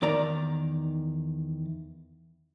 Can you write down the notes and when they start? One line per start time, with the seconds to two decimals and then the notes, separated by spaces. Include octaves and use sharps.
0.02 E2 D#3 D5 A#5